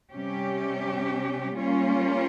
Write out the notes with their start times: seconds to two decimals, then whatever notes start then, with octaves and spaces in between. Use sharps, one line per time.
0.13 C3 G3 C#4 G4
1.56 G3 A#3 C#4 F4